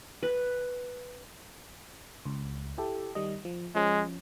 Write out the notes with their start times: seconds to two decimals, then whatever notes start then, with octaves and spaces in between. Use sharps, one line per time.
0.23 B4
2.25 C#2
2.78 E4 G4 A4
3.15 D#3 G3 D#5
3.45 F3
3.75 F3 G#3 C#4